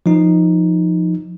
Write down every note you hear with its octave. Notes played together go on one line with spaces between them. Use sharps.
F3 D#4